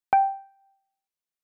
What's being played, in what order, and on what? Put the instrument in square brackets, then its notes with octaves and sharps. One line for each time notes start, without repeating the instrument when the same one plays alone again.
[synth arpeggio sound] G5